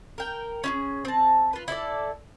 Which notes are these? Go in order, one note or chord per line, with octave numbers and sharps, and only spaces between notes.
A#4 G5
C#4 E4 G#4
C4 A5
F4 B4
E4 A4 C#5 D5